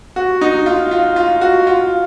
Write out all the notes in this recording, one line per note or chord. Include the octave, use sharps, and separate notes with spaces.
F#4
D#4
F4
F4
F4
F#4
F4